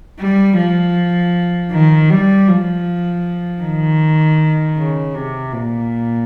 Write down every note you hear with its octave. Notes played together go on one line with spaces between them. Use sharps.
G3
F3
D#3
G3
F3
D#3
C#3
C3
A#2